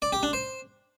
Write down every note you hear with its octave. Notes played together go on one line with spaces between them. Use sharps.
D5
G4
D4
C5